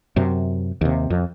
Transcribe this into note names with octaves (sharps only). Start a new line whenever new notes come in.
F#2 C3
D#2 C3
F2